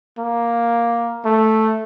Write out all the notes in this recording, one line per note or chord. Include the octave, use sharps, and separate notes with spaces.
A#3
A3